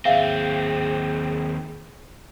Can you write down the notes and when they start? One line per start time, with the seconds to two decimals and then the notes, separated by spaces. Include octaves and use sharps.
0.05 D#2 C4 G#4 E5 F5